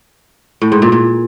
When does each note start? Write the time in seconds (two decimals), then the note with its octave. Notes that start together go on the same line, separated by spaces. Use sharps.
0.62 A2
0.72 G#2
0.82 A#2
0.92 A#2